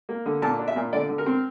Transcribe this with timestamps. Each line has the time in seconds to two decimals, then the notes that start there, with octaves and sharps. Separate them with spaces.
0.09 A#3
0.26 D3
0.42 A#2 A5
0.59 D4
0.68 E5
0.76 A#2
0.93 D3 D5
1.09 D3
1.18 A#4
1.26 C4